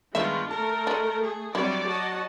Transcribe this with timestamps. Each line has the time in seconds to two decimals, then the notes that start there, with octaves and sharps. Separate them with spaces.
0.15 G2 D#3 G#3 B3 D4 F4 E5
0.51 A3 A4 A#4 A5
0.87 G#3 D4
1.22 G#4
1.55 F#3 G3 C4 D4 E4 C#5 D5 D6
1.86 F#4 D#5 A5